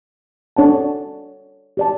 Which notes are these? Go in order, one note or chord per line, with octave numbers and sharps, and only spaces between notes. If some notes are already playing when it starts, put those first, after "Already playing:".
D4 A4 C#5 F#5 A5
G4 D5 A5